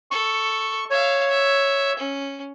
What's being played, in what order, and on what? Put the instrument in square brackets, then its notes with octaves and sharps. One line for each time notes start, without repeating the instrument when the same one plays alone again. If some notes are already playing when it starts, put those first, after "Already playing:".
[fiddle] A4 [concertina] C#6
[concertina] C#5 [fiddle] E5 F5
[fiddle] E5
C#4